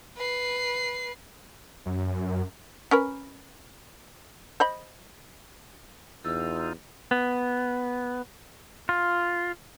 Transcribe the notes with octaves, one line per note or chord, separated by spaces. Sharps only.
B4 C7
F#2
C#4 A#4 B4
C5 D#5 B5
E2 D#4 F4 E6
B3
F4